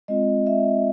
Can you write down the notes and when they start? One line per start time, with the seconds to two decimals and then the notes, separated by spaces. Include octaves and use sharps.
0.08 G#3 C4 F4 D#5
0.46 E5